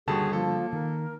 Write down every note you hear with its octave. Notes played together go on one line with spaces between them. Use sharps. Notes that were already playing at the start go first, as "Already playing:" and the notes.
D#2 D3 G3 F#4 G#4 A4 A5
F3 A#3 A4
D#3 A#4